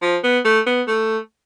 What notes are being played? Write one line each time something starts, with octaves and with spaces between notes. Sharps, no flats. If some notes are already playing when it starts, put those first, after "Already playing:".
F3
B3
A3
B3
A3